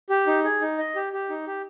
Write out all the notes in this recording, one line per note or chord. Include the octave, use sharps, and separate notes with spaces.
G4
D#4
G#4
D#4
D#5
G4
G4
D#4
G4